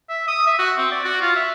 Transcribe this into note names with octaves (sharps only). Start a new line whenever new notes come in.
E5
D#6
E5
F#4
C4
D5
F#4
F4
E5